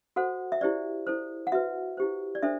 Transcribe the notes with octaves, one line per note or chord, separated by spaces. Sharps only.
F#4 A4 C5 F#5
E5
E4 G4 C5 D5
E4 A4 C5
F#5
F#4 B4 E5
E4 G4 C5
D5
D4 A4 C5 E5